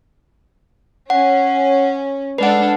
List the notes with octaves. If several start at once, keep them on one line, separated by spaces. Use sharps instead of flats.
C#4 F#5
G#3 D4 A4 B4 F#5